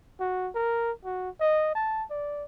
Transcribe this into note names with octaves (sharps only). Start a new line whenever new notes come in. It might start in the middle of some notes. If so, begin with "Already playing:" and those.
F#4
A#4
F#4
D#5
A5
D5